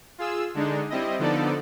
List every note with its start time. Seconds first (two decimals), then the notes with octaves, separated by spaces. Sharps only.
0.18 F4 G#4 E6
0.54 D3 G#3 D4 D#4
0.90 G3 C4 E4 D#5
1.19 D3 F3 B3 D#4 A4 D5